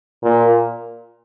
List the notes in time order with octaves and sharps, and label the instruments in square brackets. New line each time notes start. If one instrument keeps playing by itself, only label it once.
[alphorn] A#2